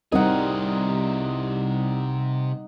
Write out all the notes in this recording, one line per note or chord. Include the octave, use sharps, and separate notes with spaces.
C2 C3 G3 C4 D#4 G#4 A#4 F#5